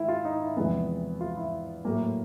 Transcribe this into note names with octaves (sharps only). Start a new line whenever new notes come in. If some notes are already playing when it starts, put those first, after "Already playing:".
Already playing: D#3 G#3 E4
F4
D#4
E4
E2 C3 F3 G#3 B3 E4
F4
E4
A2 F#3 A#3